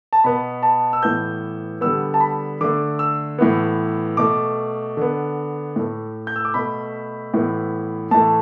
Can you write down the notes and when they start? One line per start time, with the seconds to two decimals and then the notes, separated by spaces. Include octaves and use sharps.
0.13 A5
0.24 B2 B3 B5
0.63 A5
0.93 E6
1.03 A2 E3 B3 G6
1.81 D3 G3 B3 E6
2.14 A5
2.20 B5
2.61 D3 A3 D6
2.99 E6
3.38 A2 E3 B3
4.17 B2 A3 D6
4.97 D3 B3
5.76 A2 A3
6.27 G6
6.36 E6
6.45 D6
6.54 B2 A3 B5
7.34 A2 E3 B3
8.11 A2 E3 A3 A5